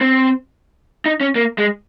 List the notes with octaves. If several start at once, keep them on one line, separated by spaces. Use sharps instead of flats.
C4
D#4
C#4
A#3
G#3